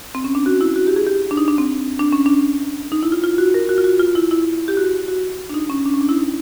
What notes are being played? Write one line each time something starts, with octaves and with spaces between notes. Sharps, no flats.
C4
C#4
D4
F#4
E4
F#4
G4
G#4
G4
D4
D#4
D4
C4
D4
C#4
D4
D#4
E4
F4
F4
F#4
A#4
F#4
F4
F#4
F4
E4
E4
G4
F#4
F#4
D4
D#4
C#4
D4
C#4
D4
E4
D#4